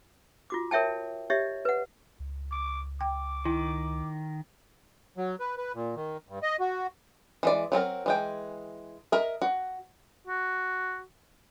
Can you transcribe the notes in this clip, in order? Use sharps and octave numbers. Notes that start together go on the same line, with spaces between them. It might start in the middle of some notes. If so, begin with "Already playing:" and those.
F4 F#4 D6
A#4 C#5 E5 G5 A5
G4 C#5 D#5 E5
B4 F#5
C#2
D6
G5 D6
D#3 E4
F#3
B4
B4
A#2
D#3
G2
D#5
F#4
E3 G#3 D5
F#3 C4 A4 A#4
E3 G#3 G5
A#4 D#5 E5
F#4
F#4